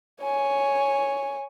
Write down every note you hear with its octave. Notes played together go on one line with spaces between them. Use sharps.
C#5 G#5